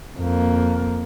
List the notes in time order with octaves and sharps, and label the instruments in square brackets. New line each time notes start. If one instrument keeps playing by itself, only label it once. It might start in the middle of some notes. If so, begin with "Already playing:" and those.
[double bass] F2 A#3